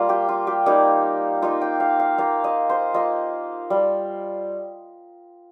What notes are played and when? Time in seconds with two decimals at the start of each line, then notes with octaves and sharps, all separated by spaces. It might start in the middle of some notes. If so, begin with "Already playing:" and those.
Already playing: G3 A#3 F4
0.09 G4
0.29 F4
0.47 G4
0.66 G3 A#3 D#4
1.42 A#3 D#4 F4
1.61 G5
1.80 F5
1.99 F5
2.18 A#3 F4 F5
2.44 D#5
2.69 C5
2.94 A#3 F4 D#5
3.70 G3